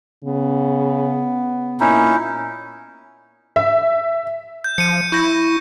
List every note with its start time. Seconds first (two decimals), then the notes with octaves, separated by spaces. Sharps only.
0.25 C#3 B3
1.80 A#2 C#4 D#4 E4
3.56 E5
4.64 G6
4.78 F3 C#7 D#7
5.12 E4 C#6 G6 A#6